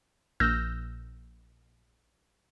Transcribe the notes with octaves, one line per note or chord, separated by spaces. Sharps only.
A#1 E6 F6 G6 A#6